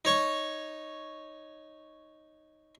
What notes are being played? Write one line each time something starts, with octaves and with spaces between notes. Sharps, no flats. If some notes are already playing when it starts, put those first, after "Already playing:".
D#4 C#5 C#6